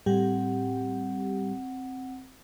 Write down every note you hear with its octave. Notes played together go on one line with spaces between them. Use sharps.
A2 G3 C4 G4 F#5